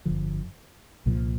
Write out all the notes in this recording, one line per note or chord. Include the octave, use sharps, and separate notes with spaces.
G1 F2 D3 F3
C2 A#2 F3